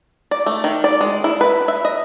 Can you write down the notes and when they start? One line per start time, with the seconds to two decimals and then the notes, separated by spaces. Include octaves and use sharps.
0.31 D5
0.46 A3
0.64 D#3
0.84 D5
1.01 G#3
1.24 E4
1.41 B4
1.68 E5
1.85 D#5